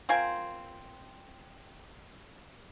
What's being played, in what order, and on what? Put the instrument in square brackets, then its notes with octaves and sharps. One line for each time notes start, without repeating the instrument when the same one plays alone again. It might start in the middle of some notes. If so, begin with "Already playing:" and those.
[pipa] C4 F4 A#4 G#5